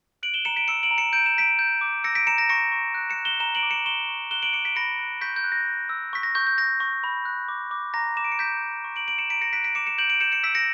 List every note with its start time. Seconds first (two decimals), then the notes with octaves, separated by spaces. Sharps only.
0.23 F#6 D7 F#7
0.34 E7 G7
0.45 A#5 C#7 E7
0.56 B6 D7
0.68 E6 C#7 E7
0.83 D7 F#7
0.91 A#5
0.98 C#7 E7
1.13 G6 D7
1.26 E7
1.37 A#5 B6 D7
1.59 G6
1.81 D6
2.04 E6 A#6 C#7
2.15 B6 D7
2.27 A#5 C#7 E7
2.38 A#6
2.49 C#6 A#6 C#7
2.72 C#6
2.94 F#6
3.10 C#7 E7
3.18 F#6
3.25 E7 G7
3.40 A#5 E7 G7
3.55 D7 F#7
3.63 D6
3.71 C#7 E7
3.85 C#6 E7 G7
4.08 C#6
4.31 F#6 E7 G7
4.43 D7 F#7
4.53 D6 C#7 E7
4.65 B6 D7
4.76 B5 A#6 C#7
4.99 F#6
5.21 C#6 G6 B6
5.36 G6
5.44 F#6
5.52 A#6
5.67 G6
5.89 E6
6.13 C#6 B6
6.23 A#6
6.35 C#6 G6
6.47 G6
6.58 G6 A#6
6.80 C#6
7.04 B5
7.25 F#6
7.48 D6
7.71 D6
7.94 A#5 A#6
8.17 D6 E7
8.24 D7
8.32 C#7
8.39 C#6 G6 B6
8.62 G6
8.84 C#6
8.96 D7 F#7
9.08 C#6 D7 F#7
9.18 C#7 E7
9.30 A#5 B6 D7
9.41 A#6 C#7
9.53 F#6 B6 D7
9.64 B6 D7
9.75 D6 C#7 E7
9.87 C#7 E7
9.98 G6 D7 F#7
10.10 D7 F#7
10.21 G6 C#7 E7
10.32 C#7 E7
10.43 E6 B6 D7
10.55 A#6 C#7